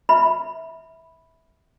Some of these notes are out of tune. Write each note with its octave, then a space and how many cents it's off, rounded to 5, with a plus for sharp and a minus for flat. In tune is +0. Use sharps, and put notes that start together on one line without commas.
E5 -20 B5 +0